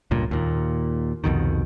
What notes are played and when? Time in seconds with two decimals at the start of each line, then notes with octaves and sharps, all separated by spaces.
0.11 C#2 G2 A#2
0.31 D#2 A#2
1.24 C2 F2 B2 D#3